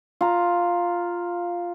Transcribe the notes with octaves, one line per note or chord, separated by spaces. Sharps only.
F4 A#5